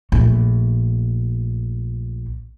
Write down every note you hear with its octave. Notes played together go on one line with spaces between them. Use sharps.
A#1 A3